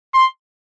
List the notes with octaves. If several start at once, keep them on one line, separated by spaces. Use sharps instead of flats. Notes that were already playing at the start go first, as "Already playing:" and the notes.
C6